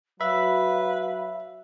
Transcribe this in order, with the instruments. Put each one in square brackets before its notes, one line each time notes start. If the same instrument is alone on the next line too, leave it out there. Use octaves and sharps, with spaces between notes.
[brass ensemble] F#3 [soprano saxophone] B4 [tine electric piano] E5 [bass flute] F5